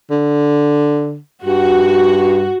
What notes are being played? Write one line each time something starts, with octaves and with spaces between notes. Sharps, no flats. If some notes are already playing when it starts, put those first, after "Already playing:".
D3
G2 F#4